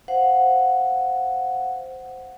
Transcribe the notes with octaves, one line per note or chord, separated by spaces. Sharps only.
C5 F5 F#5